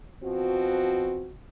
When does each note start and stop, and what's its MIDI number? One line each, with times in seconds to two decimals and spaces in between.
0.23 1.30 47
0.23 1.30 53
0.23 1.30 60
0.23 1.30 66